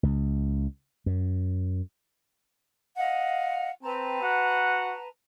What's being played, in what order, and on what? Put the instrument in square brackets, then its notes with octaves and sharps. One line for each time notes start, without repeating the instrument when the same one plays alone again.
[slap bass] C#2
F#2
[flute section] D#5 F5 F#5
[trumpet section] C4 [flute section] B4 A5 A#5
[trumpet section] F#4 F#5